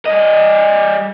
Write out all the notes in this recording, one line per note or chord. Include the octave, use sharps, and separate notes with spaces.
G3 D#5